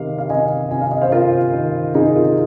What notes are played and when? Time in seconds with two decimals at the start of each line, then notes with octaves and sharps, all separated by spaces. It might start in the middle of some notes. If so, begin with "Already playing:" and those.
Already playing: C3 D#3 F5
0.18 F5
0.30 C3 D#5 G#5
0.71 C3 G#5
0.81 F5
0.92 D#5
1.02 C5 F5
1.12 C3 F4 A#4
1.54 D#3
1.94 C3 D#4 G#4
2.15 F4 A#4